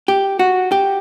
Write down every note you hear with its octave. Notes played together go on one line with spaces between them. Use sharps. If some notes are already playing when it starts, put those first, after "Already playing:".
G4
F#4
G4